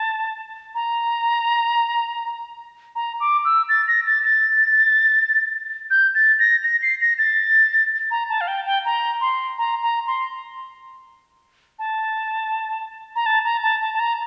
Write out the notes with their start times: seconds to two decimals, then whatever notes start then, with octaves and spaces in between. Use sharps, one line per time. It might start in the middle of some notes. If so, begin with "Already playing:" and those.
Already playing: A5
0.75 A#5
2.96 A#5
3.20 D6
3.45 E6
3.69 A6
3.88 A#6
4.06 A6
4.25 A6
5.91 G6
6.15 A6
6.39 A#6
6.64 A#6
6.82 C7
7.01 A#6
7.18 A6
8.11 A#5
8.29 A5
8.41 F5
8.48 G5
8.66 G5
8.85 A#5
9.21 C6
9.58 A#5
9.83 A#5
10.07 C6
11.79 A5
13.16 A#5
13.26 A5
13.44 A#5
13.63 A5
13.81 A5
13.94 A5
14.00 A#5